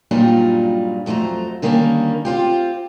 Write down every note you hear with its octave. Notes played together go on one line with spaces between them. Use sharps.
G2 A#2 F#3 G3 D#4 F4
F2 F#3 A3 C5 A#5
D3 D#3 G3 A#3 C4 C#4
C4 F4 G4